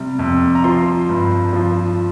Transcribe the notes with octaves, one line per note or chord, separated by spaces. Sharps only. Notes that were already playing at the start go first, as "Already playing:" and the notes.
Already playing: C3 G3
F2
A#5
F3 C6
G2
F3